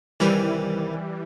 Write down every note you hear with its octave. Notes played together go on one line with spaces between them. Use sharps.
C2 D#3 E3 G3 A#4